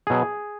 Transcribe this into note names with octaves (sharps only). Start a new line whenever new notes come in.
B2 F#3 G#4